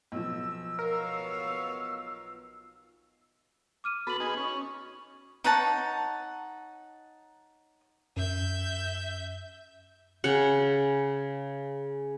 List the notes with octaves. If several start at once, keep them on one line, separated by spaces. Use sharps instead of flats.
B1 F3 E6
B3 A#4 C#5 F5
D6 F6 D#7
B3 F#4 A4 B5 F#7
B3 D#4 G#4
C#4
D#4 C#5 F#5 A5
F#2 E5 G6
C#3 F#5